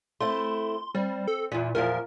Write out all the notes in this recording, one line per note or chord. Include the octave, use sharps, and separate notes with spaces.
A3 C4 E4 C6
G3 C4
A4
E2 A#2 E3
E2 A#2 F3 A#4